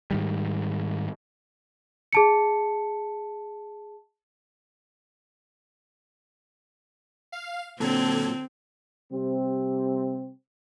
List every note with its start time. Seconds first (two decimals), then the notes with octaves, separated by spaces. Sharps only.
0.11 G#2 D#3 G3
2.13 G#4 A5 C#7
7.32 F5
7.80 A#2 D3 F#3 C4 A4 G#6
9.12 C3 G3 C4